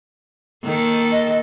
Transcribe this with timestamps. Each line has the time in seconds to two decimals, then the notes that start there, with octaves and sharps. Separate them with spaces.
0.64 D#3 A#3 A4
1.11 D#5